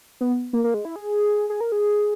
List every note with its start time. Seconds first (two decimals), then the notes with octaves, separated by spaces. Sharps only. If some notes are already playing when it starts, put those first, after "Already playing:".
0.21 B3
0.53 A#3
0.64 A#3
0.74 G#3
0.85 E4
0.96 G#4
1.50 G#4
1.61 A#4
1.72 G#4